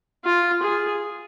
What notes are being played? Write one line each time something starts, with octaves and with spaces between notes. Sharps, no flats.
F4
G#4